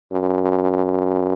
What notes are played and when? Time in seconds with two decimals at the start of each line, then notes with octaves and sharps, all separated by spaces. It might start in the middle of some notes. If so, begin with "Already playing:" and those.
0.12 F#2